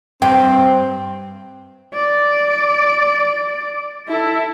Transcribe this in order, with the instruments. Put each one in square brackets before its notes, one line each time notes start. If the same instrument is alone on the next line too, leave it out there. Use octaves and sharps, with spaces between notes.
[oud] G2 [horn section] C4 [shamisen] G5
[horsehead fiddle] D5
E4 A4